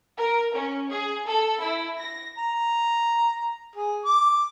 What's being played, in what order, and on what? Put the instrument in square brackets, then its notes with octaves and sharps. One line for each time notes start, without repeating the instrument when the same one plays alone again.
[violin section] A#4
C#4
G#4
A4
E4
A#6
[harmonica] A#5
G#4
D6